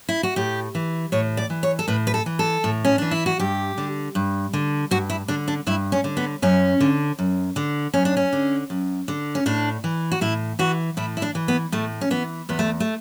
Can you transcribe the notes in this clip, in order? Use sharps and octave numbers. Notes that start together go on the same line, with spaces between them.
E4
F#4
A2 G4
E3
A2 C#5
D5
E3
C#5
A4
A2 B4
B4
A4
E3
A4
A2
C#4
E3 D4
E4
F#4
G2 G4
D3
G2
D3
G2 F#4
E4
D3 D4
D4
G2 E4
C#4
D3
B3
F#2 C#4
D3
F#2
D3
F#2 C#4
D4
C#4
D3
F#2
D3
C#4
A2 D4
E3
F#4
A2 E4
E3 F#4
A2 E4
E4
D4
E3
B3
A2 A3
C#4
E3 B3
E2 B3
A3
A3